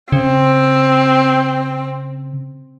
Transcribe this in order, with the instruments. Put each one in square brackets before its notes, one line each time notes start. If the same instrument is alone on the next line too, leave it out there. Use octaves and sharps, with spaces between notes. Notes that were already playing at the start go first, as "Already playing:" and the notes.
[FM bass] C#3 [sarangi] C4